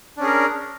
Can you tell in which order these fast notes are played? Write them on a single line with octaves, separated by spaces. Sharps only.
D4 C#4 G#4 A#4